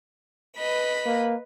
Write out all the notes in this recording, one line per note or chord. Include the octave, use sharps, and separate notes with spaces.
B4 D#5 B5
A#3